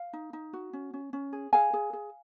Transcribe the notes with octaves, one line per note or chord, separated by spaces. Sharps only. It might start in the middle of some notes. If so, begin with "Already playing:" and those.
Already playing: F5
D#4
D#4
F#4
C#4
C#4
C#4
G#4
G#4 F5 G#5
G#4
G#4